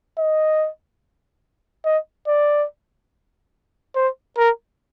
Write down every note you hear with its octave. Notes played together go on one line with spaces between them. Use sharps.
D#5
D#5
D5
C5
A#4